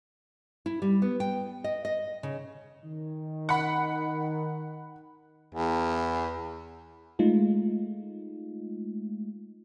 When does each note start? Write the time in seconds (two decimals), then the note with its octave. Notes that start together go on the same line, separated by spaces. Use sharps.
0.66 E4
0.82 G3
1.02 B3
1.20 G5
1.64 D#5
1.85 D#5
2.23 C#3
2.85 D#3
3.49 F#5 B5
5.54 E2
7.19 G#3 A3 D#4 F4